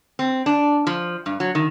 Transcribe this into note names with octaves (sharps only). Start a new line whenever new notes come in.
C4
D4
F3
G2
F#3
D#3